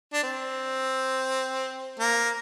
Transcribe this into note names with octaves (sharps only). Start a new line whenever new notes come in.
D4
C4
A#3